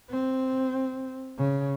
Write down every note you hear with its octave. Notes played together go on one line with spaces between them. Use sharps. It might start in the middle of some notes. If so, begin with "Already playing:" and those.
C4
C#3